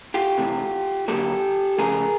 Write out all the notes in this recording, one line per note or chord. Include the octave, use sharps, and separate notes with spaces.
F4 G4
C3 E3 A3
D3 F#3 A#3 G4 A4
C#3 F3 A3 G#4 A#4